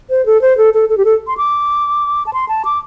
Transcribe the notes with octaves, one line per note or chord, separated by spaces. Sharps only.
C5
A4
C5
A4
A4
A4
G4
A4
C6
D6
A5
C6
A5
D6